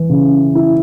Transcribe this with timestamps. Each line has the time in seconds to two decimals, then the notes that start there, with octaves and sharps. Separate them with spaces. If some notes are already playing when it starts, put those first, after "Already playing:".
Already playing: E3
0.09 C#3
0.55 E4